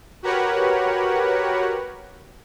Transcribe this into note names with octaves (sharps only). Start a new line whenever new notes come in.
F#4 G4 A#4 B4 C#5 F#5